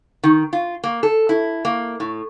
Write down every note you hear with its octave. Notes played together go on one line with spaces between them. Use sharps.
D#3
F4
A#3
A4
E4
A#3
A2